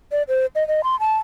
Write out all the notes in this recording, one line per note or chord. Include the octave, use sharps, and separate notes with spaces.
D5
C5
D#5
D#5
C6
A5